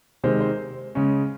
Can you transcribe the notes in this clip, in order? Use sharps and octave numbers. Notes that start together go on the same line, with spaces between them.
C3 D#3 G#3 C4 C5
C5
C#3 G#3 C#4